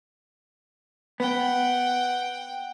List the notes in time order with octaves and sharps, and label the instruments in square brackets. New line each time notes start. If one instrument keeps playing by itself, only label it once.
[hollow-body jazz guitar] B3 [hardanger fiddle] F#5 G5